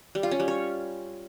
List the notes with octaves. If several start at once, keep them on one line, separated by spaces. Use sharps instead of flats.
G3
F4
C#4
G3
C#5